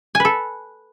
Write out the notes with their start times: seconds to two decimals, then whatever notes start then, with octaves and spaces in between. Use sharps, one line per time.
0.15 G#5
0.20 B4
0.25 A4